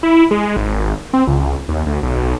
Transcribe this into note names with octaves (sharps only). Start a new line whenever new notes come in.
E4
G#3
G#1
C4
C#2
D#2
D2
B1